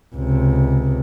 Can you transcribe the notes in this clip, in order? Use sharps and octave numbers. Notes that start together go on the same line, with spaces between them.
C#2 C3